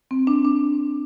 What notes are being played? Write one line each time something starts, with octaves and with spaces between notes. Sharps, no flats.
C4
D4
D4